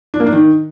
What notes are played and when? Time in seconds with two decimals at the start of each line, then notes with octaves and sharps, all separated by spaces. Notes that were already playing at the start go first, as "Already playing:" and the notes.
0.14 D4
0.20 A#3
0.26 D4
0.33 D#3